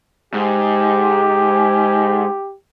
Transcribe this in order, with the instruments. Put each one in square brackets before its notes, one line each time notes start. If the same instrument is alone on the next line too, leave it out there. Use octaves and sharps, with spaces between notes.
[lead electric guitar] G#2 [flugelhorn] G4